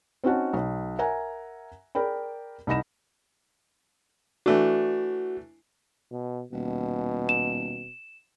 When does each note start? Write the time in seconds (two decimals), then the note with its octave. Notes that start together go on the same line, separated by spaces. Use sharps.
0.24 C4 C#4 D#4 F#4 F#5 A5
0.53 B1
0.99 A#4 E5 F#5 G#5 A#5
1.95 G#4 A#4 D5 G5 B5
2.67 C2 D#4 B5 A#6 E7
4.46 E3 A3 D4 F#4
6.11 B2
6.52 D#1 B2
7.29 E7